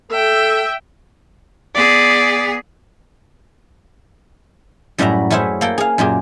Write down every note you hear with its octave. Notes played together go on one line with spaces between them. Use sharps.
A4 E5 G5
B3 G#4 D5
F#2 A2 G3 F#4 E5 A#5
A3 C#4 E4 G#4 C5 E5
A#3 A4 G5
G#4 F5
F#2 A#2 G4 G#4